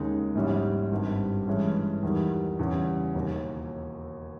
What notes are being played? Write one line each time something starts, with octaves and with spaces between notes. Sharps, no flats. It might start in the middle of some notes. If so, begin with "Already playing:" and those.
Already playing: D#2 C#3 G#3 D#4
A#1 G#2 G3 C#4 E4
G#1 G2 G3
G2 E3 G#3 C#4 E4
E2 D#3 G3
E2 C#3 G3
E1 D#2 D#3